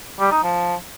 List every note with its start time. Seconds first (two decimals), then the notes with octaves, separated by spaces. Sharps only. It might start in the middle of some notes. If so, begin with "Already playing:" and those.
0.20 G3
0.31 D#4
0.43 F3